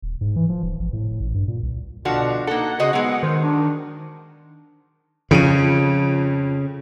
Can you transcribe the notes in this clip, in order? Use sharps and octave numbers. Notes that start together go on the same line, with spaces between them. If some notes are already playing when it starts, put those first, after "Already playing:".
D#1
G#2
E3
F3
D#1
G#1
A2
A2
A1
G2
A#2
C2
B2 D3 F3 F#4
A#3 D#4 A4 F#5
C#3 F#4 C5 D#5
F#3 G#3 B3
D#3 C5
D4
F2 C#3 D#7